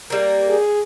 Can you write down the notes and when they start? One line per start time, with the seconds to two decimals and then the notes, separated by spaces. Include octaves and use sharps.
0.10 G3 A#3
0.49 G#4